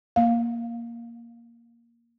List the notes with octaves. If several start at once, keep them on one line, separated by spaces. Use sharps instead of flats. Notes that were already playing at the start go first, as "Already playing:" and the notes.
A#3 F5